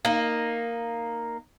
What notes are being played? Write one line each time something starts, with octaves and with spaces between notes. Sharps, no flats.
A#3 D#4